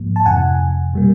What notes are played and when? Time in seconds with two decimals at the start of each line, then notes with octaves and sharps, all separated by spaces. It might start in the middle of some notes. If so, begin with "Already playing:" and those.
Already playing: G#2 F3 A#3
0.16 A5
0.26 F2 C3 E3 F#5 G#5
0.94 B2 G3 A#3